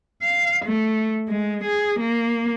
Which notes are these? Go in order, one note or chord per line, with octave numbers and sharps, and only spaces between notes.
F5
A3
G#3
G#4
A#3